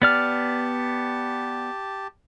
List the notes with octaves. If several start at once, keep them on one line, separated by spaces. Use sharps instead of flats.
B3 G4 D5 A5 F6